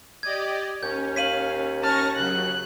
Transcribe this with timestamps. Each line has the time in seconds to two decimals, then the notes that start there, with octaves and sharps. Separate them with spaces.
0.23 G4 D5 D#5 G#6
0.83 D#2 C#4 G6
1.16 F5 B6 D#7 F#7
1.83 C#4 A5 C#6 F6 A#6
2.16 C#3 F#3 F#6